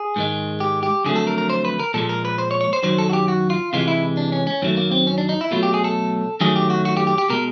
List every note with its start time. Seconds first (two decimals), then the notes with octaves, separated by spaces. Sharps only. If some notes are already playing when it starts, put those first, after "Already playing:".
Already playing: G#4
0.16 G#2 D#3 G#3
0.60 G4
0.83 G4
1.05 F2 D3 F#3 A3 G#4
1.16 A4
1.27 A#4
1.38 A#4
1.50 C5
1.65 B4
1.80 A#4
1.94 A#2 F3 G#3 A4
2.09 A#4
2.25 B4
2.38 C5
2.51 C#5
2.61 C#5
2.73 C5
2.83 F#2 D#3 F#3 C5
2.98 A4
3.10 F#4
3.13 G4
3.28 F#4
3.50 F4
3.73 C3 E3 G#3 F4
3.88 E4
4.17 D4
4.32 C#4
4.47 C#4
4.62 F#2 D#3 F#3 A3 C4
4.77 A#3
4.92 C4
5.07 C#4
5.18 D4
5.29 D#4
5.41 E4
5.51 B2 F#3 A3 F4
5.63 G4
5.74 G#4
5.84 A4
6.41 F#2 D#3 F#3 A3 G#4
6.56 G4
6.70 F#4
6.85 F#4
6.97 G4
7.07 G4
7.18 G4
7.30 B2 G#3 A#4